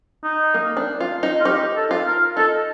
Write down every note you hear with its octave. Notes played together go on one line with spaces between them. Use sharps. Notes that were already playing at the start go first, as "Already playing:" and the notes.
D#4
A#3
D4
F4
D#4
F4
D#4 G4
A4
F4
A#4
D#4 A4